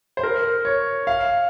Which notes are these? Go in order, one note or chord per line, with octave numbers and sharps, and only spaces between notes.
C5
A#4
C#5
F5